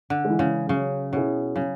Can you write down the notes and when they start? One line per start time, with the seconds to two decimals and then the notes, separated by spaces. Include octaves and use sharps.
0.10 D3
0.25 G#3
0.30 E3
0.39 C#3
0.69 C#3 F#3
1.12 B2 C#4 E4 G#4
1.56 C#3 F#3